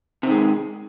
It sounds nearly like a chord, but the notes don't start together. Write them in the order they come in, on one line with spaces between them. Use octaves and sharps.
C3 D#3 G#3